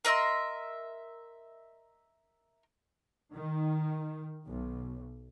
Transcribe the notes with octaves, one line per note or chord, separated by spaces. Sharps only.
A#4 D#5 E5 C6
D#3
B1